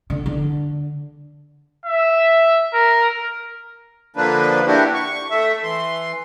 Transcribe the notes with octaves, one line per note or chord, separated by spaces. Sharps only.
D3
D3
E5
A#4
D3 F3 A#3 D4 B4
A#3 D4 E4 F#4 G4
C#6
A3 E5
E3 C6